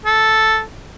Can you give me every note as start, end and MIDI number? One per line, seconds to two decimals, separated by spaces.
0.06 0.61 69